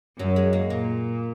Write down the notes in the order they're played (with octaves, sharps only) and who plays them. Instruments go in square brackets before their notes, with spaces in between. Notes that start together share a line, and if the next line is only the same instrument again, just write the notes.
[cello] F#2 [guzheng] F#3
[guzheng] G#3
A#3
[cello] A#2 [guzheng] A#3